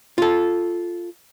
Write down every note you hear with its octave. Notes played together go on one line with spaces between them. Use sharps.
F4 A4